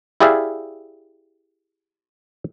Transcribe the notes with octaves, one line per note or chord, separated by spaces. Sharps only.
E4 G4 G#4 D5 E5 F5